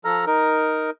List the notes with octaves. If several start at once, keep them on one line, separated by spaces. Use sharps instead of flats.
F3 A4 A#5 F6
D#4 A#4